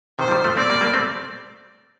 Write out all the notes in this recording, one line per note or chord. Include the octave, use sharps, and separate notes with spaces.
C3 D#3 C5
F3
D#3 G3
F3 A3
A3 C4 D5
G3 A#3
G3 A#3
A3 C4